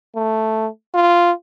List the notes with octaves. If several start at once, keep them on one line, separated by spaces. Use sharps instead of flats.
A3
F4